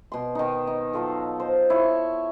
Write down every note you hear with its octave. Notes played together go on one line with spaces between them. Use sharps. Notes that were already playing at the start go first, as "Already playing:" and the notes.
B2 C6
D#3 D#4
D#4
F#3 F4 A4
C5
E4 C#5